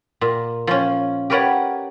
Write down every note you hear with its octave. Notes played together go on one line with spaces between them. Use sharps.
A#2
F3 C#4
G4 A#4 B4 C#5 D5 F#5